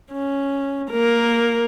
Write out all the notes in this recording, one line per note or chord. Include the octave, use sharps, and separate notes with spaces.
C#4
A#3 A#4